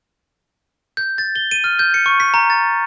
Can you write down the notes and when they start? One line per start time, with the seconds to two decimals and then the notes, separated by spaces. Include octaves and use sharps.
0.97 G6
1.18 A6
1.36 G7
1.51 D#7
1.64 F6
1.79 G6
1.94 C#7
2.06 C#6
2.20 B6
2.34 A#5
2.50 A6